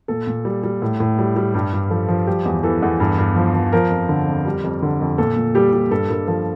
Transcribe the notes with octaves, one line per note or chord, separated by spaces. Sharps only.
A#2 A4
A#2
G3
G3
A2
A2
G3
G3
G2 G4
G2
F3 A4
F3
G3 G4
E2
E3 A4
E2
G2
G2
F3
F3
F3 A#4
F2
D3
F2
G3
F2
D3
F2
A#2 A4
A#2
G3 G4
G3
G2 A4
G2 A#4
F3 A4